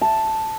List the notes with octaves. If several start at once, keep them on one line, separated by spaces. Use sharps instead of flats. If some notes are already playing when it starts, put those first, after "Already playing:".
A5